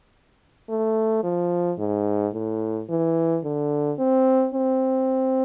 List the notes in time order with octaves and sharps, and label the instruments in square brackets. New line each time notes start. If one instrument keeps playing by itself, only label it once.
[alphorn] A3
F3
G#2
A2
E3
D3
C4
C4